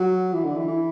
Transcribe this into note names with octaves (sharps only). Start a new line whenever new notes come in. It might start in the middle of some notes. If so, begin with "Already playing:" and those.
Already playing: F#3
E3
D3
E3
E3